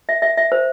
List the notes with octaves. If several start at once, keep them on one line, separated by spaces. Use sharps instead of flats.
E5
E5
E5
C5